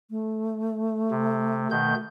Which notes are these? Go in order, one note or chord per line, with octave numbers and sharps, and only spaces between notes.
A3
C3
B2 D#3 G6